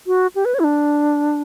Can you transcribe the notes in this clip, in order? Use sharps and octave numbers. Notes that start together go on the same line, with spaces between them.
F#4
G4
B4
C#5
E4
D4